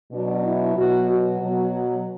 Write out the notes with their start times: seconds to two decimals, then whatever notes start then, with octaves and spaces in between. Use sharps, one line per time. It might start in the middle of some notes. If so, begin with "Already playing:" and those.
0.12 B2 F#3 D4
0.44 E4
0.76 B2 F#3 F#4
1.09 F#4
1.41 B2 F#3